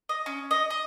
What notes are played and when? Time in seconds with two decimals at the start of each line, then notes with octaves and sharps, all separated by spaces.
0.09 D#5
0.26 C#4
0.51 D#5
0.70 D#5